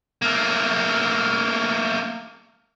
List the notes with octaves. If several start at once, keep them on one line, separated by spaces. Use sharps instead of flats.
A3 A#3